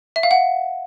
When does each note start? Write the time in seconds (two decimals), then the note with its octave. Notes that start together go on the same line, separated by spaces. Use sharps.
0.16 E5
0.23 F5
0.31 F#5